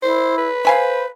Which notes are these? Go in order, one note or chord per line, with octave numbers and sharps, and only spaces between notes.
E4 C5
B4
C5 F5 G#5 B5